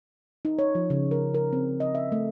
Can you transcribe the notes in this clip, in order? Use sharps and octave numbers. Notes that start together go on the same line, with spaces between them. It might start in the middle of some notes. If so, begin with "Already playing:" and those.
D#4
C#5
F3
C#3
A#4
A#4
C4
D#5
E5
A3